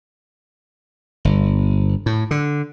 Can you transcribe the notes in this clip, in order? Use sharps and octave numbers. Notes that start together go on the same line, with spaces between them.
G1
A2
D3